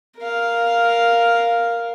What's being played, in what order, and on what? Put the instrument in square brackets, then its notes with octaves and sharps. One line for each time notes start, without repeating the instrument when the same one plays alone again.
[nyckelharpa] A#4 F5